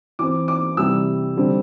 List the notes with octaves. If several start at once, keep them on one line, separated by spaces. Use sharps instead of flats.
E3 C4 D6
D6
C3 E3 G3 E6
D3 G3 C4